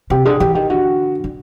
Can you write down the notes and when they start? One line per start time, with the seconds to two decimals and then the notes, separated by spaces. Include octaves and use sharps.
0.10 C3 G4
0.25 D3 G#4
0.40 E3 G4
0.55 D#3 G4
0.70 D3 F#4
1.24 D3